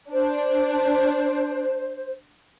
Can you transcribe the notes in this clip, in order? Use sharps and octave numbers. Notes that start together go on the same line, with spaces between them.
D4 C5